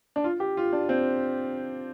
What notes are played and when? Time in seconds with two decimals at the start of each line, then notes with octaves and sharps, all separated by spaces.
0.16 D4
0.24 F4
0.40 G4
0.57 F4
0.73 D4
0.89 C4